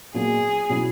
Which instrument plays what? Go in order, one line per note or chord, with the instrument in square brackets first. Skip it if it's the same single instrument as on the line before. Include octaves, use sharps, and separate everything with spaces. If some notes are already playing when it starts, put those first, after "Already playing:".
[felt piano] A#2 F#3 B3 [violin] G#4
[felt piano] B2 F#3 C#4 E4